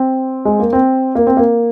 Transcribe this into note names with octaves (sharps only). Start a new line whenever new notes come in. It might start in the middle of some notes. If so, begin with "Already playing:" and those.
Already playing: C4
G#3
A#3
C4
A#3
C4
A#3